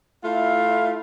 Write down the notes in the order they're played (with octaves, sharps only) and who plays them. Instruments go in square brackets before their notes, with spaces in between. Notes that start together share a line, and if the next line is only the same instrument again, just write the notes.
[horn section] A3 E4 F4 F5